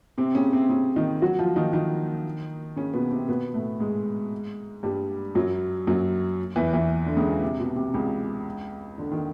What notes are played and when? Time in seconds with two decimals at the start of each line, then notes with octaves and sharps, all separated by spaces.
0.18 C3 C4
0.35 C#3 C#4
0.52 C3 C4
0.69 C#3 C#4
0.96 D#3 D#4
1.22 F#3 F#4
1.39 F3 F4
1.56 D#3 D#4
1.73 D#3 D#4
2.76 C#3 C#4
2.94 B2 B3
3.11 C3 C4
3.28 B2 B3
3.54 A2 A3
3.80 G#2 G#3
4.83 G2 G3
5.35 F#2 F#3
5.87 F#2 F#3
6.56 E2 E3
6.73 E2 E3
7.06 D3
7.16 C#2 C#3
7.42 C3
7.60 B2
7.76 C3
7.94 C#2 C#3
8.98 D3
9.12 D#3